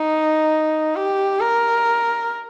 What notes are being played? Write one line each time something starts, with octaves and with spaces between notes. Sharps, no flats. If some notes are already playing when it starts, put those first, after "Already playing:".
Already playing: D#4
G4
A#4